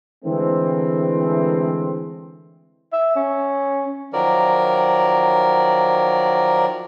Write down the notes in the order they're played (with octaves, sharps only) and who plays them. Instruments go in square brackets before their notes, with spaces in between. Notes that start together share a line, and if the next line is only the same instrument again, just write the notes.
[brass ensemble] D3 E3 G#3 A3 C4
[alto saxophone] E5
C#4
[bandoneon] D#3 F3 F#3 A#4 D5